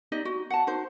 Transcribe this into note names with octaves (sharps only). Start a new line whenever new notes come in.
D#4 G4 D5 D#5
F#4
F#5 A5
D#4 F#4 C5